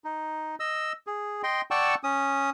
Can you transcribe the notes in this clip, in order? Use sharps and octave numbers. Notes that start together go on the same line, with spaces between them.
D#4
D#5 E6
G#4
D#5 G5 C6
D5 F#5 G5 A5 C#6 E6
C#4 D#6